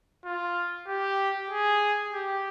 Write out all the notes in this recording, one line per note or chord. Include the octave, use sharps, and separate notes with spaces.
F4
G4
G#4
G4